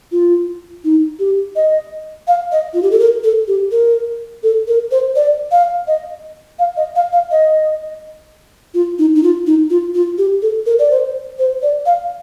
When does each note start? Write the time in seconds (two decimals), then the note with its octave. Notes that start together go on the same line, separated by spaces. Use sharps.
0.12 F4
0.84 D#4
1.19 G4
1.56 D#5
2.27 F5
2.52 D#5
2.74 F4
2.83 G4
2.91 A4
2.99 A#4
3.24 A4
3.48 G4
3.72 A#4
4.43 A4
4.68 A#4
4.91 C5
5.16 D5
5.51 F5
5.87 D#5
6.59 F5
6.77 D#5
6.95 F5
7.13 F5
7.31 D#5
8.74 F4
8.99 D#4
9.16 D#4
9.23 F4
9.47 D#4
9.70 F4
9.95 F4
10.18 G4
10.42 A4
10.66 A#4
10.79 D5
10.91 C5
11.39 C5
11.62 D5
11.86 F5